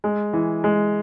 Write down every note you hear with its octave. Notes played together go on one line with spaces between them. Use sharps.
G#3
E3
G#3